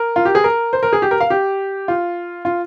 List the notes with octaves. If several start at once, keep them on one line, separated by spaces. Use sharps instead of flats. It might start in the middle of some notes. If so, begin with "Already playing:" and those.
Already playing: A#4
F4
G4
G#4
A#4
C5
A#4
G#4
G4
A#4
F5
G4
F4
F4